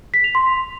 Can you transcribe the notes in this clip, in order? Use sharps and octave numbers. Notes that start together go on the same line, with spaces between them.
B6
F7
C6